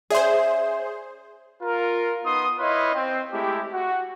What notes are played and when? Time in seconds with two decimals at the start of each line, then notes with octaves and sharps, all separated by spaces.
0.10 C#4 G#4 C5 D5 E5
1.62 F4 A#4
2.25 B3 D#4 C6 D#6
2.59 E4 B4 C#5 D#5 F5 C6
2.94 C4
3.31 G#3 A3 E4 G4
3.73 F#4